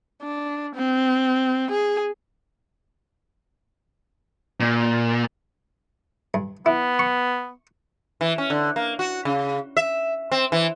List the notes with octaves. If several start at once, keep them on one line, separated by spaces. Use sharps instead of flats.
D4
C4
G#4
A#2
G2
B3 E4
C#6
E3
C#4
D3
A#3
F#4
C#3
E5
C4
E3